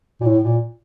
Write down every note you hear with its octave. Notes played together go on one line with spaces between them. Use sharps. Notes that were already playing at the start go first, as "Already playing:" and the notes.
A#2
A2
A#2